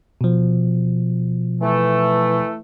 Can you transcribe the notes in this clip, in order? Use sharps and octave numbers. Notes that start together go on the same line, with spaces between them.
B2 F3
E3 A3